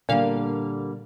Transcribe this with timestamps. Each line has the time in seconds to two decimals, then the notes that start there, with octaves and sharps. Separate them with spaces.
0.09 A#2 D3 G3 A#3 F5